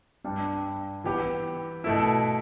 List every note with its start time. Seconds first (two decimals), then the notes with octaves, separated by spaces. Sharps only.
0.24 G2 G3 D4
1.04 E3 B3 G4
1.84 B2 A3 E4